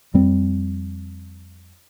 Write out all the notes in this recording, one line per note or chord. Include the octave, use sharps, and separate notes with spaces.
F2 G3 C4